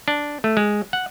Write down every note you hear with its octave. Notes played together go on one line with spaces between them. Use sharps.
D4
A3
G#3
F#5